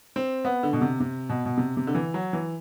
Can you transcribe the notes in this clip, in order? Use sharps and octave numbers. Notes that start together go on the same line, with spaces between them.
C4
B3
D3
B2
C3
C3
B2
B2
C3
C3
D3
E3
F#3
E3